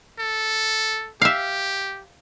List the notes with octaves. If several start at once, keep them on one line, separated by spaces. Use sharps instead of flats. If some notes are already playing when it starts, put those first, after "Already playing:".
A4
G4 E5 F5